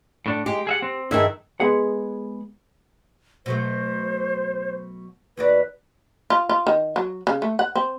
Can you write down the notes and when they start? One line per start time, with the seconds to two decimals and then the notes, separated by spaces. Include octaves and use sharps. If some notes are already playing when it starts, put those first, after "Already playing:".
0.26 A2 D4 A4
0.46 G#3 G4
0.67 G#4 E5 F#5
0.82 C4
1.11 G2 D#3 E4 G#4 E5
1.60 G#3 B3 G#4 F#5
3.46 B2 F#3 A3 C5
5.37 D#2 F#4 B4 D5
6.30 F4
6.49 F4
6.67 D#3
6.96 F#3
7.27 C#3
7.42 A3
7.59 F#5
7.76 C4